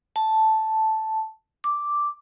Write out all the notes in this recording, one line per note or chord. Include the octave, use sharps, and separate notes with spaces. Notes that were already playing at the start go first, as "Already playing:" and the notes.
A5
D6